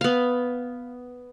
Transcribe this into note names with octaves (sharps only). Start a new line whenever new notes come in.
B3 F5